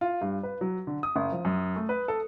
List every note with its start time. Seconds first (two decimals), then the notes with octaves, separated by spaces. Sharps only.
0.01 F4
0.21 G2
0.43 B4
0.61 F#3
0.87 D3
1.03 D#6
1.16 F#1
1.32 F3
1.45 F#2
1.76 A3
1.89 B4
2.08 A4